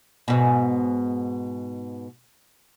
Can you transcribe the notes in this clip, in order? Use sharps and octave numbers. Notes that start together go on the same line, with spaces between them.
G#2 B2